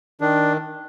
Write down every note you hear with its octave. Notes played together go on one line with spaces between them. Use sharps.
D#3 D4